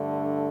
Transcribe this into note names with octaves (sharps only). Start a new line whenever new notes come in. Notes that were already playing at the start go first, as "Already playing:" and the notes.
Already playing: G2 D3 A3